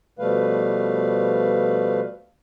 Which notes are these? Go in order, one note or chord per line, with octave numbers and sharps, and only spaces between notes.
B2 F3 G3 A3 B4 F5